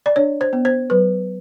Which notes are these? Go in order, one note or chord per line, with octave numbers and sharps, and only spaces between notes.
D5
D4 C#5
C5
B3
C5
F#3 B4